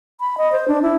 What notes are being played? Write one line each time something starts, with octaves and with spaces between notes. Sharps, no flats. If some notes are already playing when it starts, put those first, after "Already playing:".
B5
D#5
C5
D4
E4